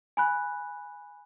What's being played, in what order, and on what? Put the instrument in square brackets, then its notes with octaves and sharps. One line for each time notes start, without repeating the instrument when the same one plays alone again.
[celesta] G#5 B5 F#6